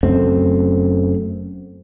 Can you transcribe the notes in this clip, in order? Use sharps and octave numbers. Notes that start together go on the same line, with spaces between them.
F#1 F#2 A3 C4